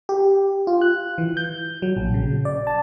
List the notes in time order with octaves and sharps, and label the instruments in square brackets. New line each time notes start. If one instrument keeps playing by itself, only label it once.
[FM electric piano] G4
F4
F#6
E3
G6
F#3
A#1
C#3
D5
A5